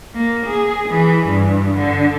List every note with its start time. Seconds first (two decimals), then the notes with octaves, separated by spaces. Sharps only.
0.14 A#3
0.46 G#4
0.88 E3
1.27 G2
1.76 D3